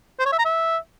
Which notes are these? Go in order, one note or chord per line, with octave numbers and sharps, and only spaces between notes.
C5
C#5
E5
A#5
E5